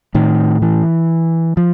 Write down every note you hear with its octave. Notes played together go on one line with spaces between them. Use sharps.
A2 D#3
E3
F3